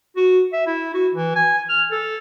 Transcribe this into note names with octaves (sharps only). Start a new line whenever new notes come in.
F#4
E5
E4
F#4
E3
G#5
F6
A4